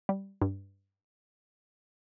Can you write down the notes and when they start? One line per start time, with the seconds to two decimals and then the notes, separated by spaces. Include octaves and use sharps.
0.09 G3
0.42 G2